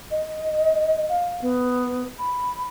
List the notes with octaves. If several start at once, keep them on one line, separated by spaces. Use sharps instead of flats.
D#5
F5
B3
B5